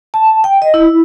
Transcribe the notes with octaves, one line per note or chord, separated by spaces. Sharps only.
A5
G5
D#5
E4